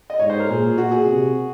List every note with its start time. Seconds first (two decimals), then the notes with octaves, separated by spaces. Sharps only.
0.10 D#5
0.19 G#2 C#5
0.30 C5
0.39 A#4
0.49 A#2 G#4
0.77 A#2 F#4
0.91 G#4
1.06 C3